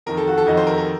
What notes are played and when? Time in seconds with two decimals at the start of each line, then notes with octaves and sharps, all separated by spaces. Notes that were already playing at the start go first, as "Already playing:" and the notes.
0.06 F2 D#3 A#4
0.17 A4
0.27 F#4
0.38 A4
0.46 F2 D#3 D#5
0.57 C5
0.67 A#4
0.78 A#4